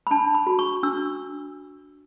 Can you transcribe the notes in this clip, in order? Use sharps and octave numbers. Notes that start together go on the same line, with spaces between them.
B5
D4 A5
B5
F#4
C#6
D4 E6